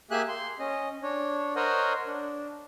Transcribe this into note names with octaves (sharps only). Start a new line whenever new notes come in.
A#3 G4 G#4 E5 G#5 F#6
C6
C#4 D#5
D4 C#5
A#4 C5 C#5 D#5 F#5
D4